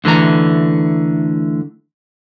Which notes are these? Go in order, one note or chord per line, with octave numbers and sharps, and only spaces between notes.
D2 D3 E3 A3 A#5